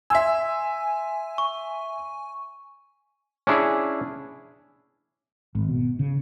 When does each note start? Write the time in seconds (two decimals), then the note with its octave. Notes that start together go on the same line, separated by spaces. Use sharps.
0.10 E5 G#5 C6 E6
1.38 C#6
3.47 C#4 D4 E4 G#4
5.55 G#1
5.69 B2
5.99 C#3